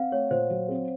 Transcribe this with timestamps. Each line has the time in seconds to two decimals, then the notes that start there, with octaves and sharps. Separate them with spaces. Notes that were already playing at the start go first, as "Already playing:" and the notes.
Already playing: C4 F5 F#5
0.12 A3 C#5
0.30 A#2 C5
0.50 F#3
0.69 C4